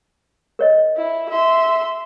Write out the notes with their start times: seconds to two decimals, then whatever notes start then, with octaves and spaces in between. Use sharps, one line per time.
0.59 A#4 C#5 D#5
0.97 E4
1.30 E5 C6